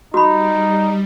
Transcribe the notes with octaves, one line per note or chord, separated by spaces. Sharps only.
G3 D#4 F#4 B5